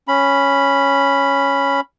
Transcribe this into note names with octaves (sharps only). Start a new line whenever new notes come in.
C#4 B5